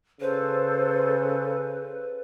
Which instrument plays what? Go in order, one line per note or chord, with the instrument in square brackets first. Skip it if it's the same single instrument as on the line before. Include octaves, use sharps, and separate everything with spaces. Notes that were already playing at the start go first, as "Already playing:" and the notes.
[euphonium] C#3 [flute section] A4 C5 [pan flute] B4